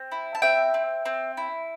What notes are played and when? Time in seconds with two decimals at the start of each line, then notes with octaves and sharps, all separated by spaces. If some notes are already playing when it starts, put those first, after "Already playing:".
Already playing: C4
0.12 E4
0.35 A5
0.42 C4 E5 G5
0.74 C4
1.05 C4
1.37 E4